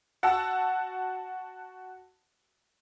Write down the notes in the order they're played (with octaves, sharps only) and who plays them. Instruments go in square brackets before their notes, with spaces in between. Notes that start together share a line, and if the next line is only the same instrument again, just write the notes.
[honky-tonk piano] F#4 F#5 A5 E6